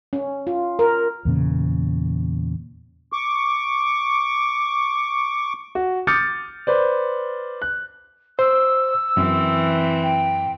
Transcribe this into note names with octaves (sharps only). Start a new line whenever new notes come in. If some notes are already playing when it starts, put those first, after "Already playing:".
C#4
F4
A#4
E2 A#2 C#3
C#6 D6
F#4
D6 D#6 F6 G6 A6 C#7
B4 C5 D5
F#6
C5 E6
F#2 E3 C4
G5